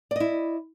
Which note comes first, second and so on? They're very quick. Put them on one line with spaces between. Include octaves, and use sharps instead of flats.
D5 D#5 E4